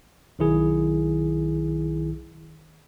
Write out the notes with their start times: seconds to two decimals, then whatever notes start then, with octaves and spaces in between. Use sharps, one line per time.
0.39 B1 D#3 E4 G#4